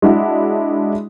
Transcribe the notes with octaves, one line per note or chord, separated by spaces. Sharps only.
G#3 D4 E4 F#4